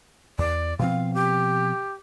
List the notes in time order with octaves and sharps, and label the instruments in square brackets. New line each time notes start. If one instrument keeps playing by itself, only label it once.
[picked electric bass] E2 [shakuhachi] D5
[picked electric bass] B2 F3 C4 [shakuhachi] F5
[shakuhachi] G4